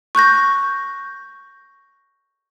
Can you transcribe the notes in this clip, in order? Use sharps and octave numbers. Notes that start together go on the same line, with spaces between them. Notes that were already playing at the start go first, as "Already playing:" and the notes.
C#6 F#6 G6 A#6